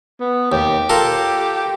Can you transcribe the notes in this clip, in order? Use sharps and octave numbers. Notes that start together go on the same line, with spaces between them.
B3
D#2 G4
F4 A4 A#4